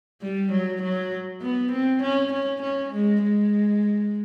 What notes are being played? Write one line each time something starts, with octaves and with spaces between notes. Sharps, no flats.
G3
F#3
F#3
B3
C4
C#4
C#4
C#4
G#3
G#3